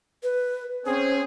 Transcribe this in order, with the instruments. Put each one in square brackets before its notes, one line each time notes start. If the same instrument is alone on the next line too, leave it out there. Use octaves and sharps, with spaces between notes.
[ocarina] B4
[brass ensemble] C4 C#4 G#4 [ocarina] C5